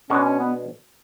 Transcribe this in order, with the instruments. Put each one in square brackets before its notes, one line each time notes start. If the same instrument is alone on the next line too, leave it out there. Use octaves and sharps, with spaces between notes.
[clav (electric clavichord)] B2 G#3 D4 F#4 [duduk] C#4
[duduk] C#4
B3